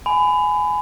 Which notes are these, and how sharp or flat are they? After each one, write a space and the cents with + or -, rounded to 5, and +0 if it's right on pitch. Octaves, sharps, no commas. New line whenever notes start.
G#5 +10 B5 +25